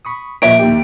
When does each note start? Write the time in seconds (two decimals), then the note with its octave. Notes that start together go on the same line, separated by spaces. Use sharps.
0.05 B5 C#6 D#6
0.42 A#2 F3 A#3 C#5 D#5 E5 D7
0.59 D#2 G4